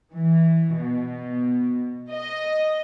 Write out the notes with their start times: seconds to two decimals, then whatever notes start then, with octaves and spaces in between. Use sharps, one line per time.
0.14 E3
0.79 B2
2.11 D#5